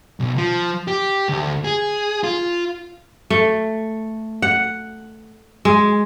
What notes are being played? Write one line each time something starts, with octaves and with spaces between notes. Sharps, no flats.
B1
F3
G4
D2
G#4
F4
A3
F#5
G#3